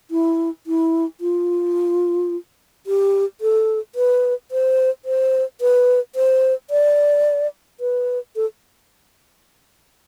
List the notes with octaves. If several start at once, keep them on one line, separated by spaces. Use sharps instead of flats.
E4
E4
F4
G4
A4
B4
C5
C5
B4
C5
D5
B4
A4